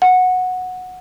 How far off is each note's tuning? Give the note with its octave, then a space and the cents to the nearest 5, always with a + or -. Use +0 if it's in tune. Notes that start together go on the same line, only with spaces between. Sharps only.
F#5 -10